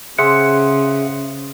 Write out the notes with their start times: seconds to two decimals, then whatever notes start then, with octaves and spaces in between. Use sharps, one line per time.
0.19 C#3 G#4 C5 E5 F#5